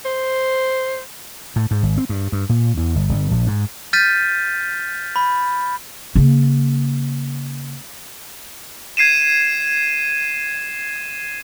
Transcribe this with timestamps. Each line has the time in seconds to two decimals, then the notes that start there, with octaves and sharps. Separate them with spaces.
0.05 C5
1.56 A2
1.71 G#2
1.83 G#1
1.98 C4
2.09 G2
2.32 G2
2.49 A#2
2.77 E2
2.95 G1
3.09 G1
3.31 A#1
3.47 G#2
3.93 F6 G6 A6 B6 D#7
5.16 B5
6.15 C#3 A#3
8.97 G#6 C7 D#7 E7